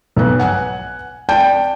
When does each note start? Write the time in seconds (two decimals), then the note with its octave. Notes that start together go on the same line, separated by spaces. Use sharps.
0.16 B1 B3 F#6
0.39 F#5 G#5 F#6
1.29 D5 G5 A5 G6